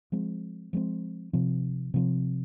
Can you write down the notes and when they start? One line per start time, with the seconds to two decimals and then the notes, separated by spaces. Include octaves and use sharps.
0.12 F3 G#3 C4
0.73 F3 G#3 C4
1.33 C3 F3 C4
1.94 C3 F3 C4